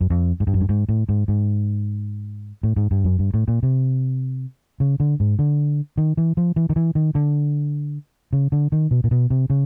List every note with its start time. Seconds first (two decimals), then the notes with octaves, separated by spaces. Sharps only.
0.01 F#2
0.10 F2
0.40 G#2
0.47 G2
0.54 F#2
0.61 G2
0.69 G#2
0.89 A2
1.09 G#2
1.28 G#2
2.63 A2
2.76 G#2
2.91 G2
3.05 F#2
3.19 G2
3.34 A2
3.48 A#2
3.63 C3
4.80 C#3
5.00 D3
5.20 G#2
5.39 D3
5.97 D#3
6.17 E3
6.37 F3
6.56 E3
6.70 D#3
6.76 E3
6.95 D#3
7.15 D3
8.33 C#3
8.52 D3
8.72 D#3
8.91 B2
9.04 A#2
9.11 B2
9.30 C3
9.50 C#3